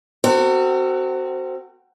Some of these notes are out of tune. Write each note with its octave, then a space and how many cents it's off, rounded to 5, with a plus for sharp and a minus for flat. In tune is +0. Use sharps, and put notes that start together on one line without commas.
C4 +0 F#4 +15 A#4 -45